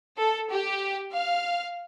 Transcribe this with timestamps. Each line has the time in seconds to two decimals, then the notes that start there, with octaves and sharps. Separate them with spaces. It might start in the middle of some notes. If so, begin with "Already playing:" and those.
0.18 A4
0.51 G4
1.13 F5